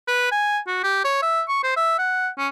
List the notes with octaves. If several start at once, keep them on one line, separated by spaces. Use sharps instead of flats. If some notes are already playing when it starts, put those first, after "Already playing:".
B4
G#5
F#4
G4
C#5
E5
C#6
C5
E5
F#5
C#4